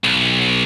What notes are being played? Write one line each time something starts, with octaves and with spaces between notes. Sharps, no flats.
B1